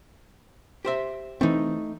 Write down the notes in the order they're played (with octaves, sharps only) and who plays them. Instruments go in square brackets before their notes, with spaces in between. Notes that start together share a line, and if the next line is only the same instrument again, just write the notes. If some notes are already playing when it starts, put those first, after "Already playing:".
[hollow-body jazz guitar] G4 C5 E5
[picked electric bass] E3 C4 [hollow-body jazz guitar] A3 D#4